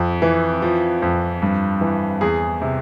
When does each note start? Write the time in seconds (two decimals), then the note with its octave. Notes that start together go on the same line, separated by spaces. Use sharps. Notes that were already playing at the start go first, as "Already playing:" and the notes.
Already playing: F2
0.22 E3
0.62 F3
1.02 F2
1.42 G2
1.81 E3
2.21 E2 G#4
2.62 C3